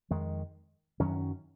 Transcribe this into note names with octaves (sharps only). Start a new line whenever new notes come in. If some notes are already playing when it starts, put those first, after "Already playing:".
F2 D#3 G#3
F#2 D#3 F#3 C#4